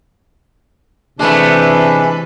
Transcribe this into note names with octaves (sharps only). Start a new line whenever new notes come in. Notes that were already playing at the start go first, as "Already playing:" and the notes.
C3 E3 G#3 A3 D4 B4